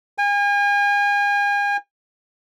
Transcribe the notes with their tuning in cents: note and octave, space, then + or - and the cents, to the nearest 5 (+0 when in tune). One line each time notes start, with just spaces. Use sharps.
G#5 -40